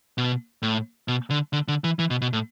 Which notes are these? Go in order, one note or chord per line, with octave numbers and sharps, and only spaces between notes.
B2
A2
B2
D3
D3
D3
E3
E3
B2
B2
A2